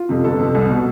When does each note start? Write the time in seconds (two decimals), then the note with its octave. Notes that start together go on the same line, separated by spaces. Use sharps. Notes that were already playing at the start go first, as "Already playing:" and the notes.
Already playing: F4
0.09 F2 C3
0.24 G1 A4
0.39 F2 C3
0.55 C2
0.70 B2